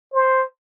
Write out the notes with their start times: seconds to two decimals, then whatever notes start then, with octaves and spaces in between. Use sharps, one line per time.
0.13 C5